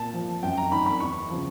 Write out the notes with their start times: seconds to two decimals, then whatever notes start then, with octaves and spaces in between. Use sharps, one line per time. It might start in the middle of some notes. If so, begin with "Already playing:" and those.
Already playing: A#2 A5
0.14 F3
0.43 F#2 G5
0.57 A#5
0.71 D#3 B5
0.86 B5
1.00 E2 C#6
1.30 C#3 F3